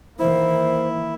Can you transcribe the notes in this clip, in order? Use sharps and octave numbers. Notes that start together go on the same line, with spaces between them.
D#3 E3 A#3 E4 C5